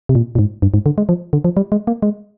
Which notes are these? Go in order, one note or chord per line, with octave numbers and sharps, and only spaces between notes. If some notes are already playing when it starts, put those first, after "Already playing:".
C3
A#2
A#2
G#2
G2
G#2
D3
G#3
F3
D3
F3
G3
G#3
A#3
G#3